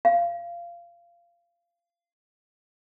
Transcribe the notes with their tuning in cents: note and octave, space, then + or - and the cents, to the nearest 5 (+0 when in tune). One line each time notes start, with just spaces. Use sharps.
F5 -20